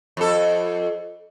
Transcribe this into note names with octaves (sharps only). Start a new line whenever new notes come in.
F2 A4